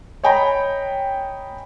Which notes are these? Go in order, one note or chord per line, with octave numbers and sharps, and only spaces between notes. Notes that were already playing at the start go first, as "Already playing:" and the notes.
C#5 D#5 G5 G#5 A#5 B5